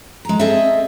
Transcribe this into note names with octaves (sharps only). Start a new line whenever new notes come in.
G#3 A#5
C4 G#4 A4 D#5 E5